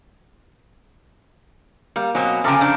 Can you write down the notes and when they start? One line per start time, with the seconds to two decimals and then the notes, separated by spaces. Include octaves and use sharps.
1.96 G3 A#3
2.15 B2 F#3 C4 D#5 G#5
2.44 C#3 F3 A4 F5 G5 G#5 A#5 D6
2.60 F2 C#3 D4 G6